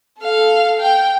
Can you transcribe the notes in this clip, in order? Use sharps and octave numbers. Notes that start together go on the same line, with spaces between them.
A4 F5
G5